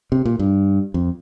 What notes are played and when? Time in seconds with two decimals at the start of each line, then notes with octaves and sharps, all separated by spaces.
0.12 C3
0.25 A#2
0.39 G2
0.94 F2